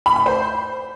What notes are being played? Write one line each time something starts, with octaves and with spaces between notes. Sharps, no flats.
B5
B5
C5